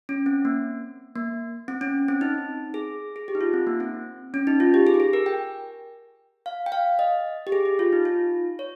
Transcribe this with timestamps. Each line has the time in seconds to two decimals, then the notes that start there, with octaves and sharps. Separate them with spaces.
0.09 C#4
0.26 C4
0.45 A#3
1.16 A#3
1.68 C4
1.81 C#4
2.08 C4
2.21 D#4
2.74 G#4
3.16 G#4
3.28 G4
3.35 D#4
3.41 F4
3.53 C4
3.67 A#3
3.80 C4
4.34 C#4
4.47 D#4
4.60 F4
4.74 G4
4.87 G#4
4.94 G4
5.00 G#4
5.13 A#4
5.26 G5
6.46 F5
6.66 G5
6.72 F5
6.99 D#5
7.47 G4
7.52 G#4
7.65 G4
7.79 F4
7.93 D#4
8.05 F4
8.59 C#5